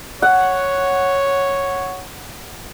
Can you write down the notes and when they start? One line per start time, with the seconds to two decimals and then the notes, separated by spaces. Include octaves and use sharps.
0.22 C#5 F#5